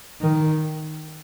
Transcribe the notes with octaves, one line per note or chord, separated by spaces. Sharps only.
D#3